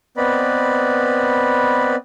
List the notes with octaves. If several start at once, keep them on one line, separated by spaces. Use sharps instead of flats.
B3 C4 B4 D5 D#5 B5